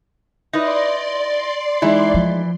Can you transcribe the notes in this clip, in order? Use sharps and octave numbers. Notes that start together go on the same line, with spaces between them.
D#4 E4 B4 D5 C6 A#6
E3 G#3 D#4 E4
F3